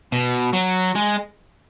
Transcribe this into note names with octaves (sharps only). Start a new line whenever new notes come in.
B2
F#3
G#3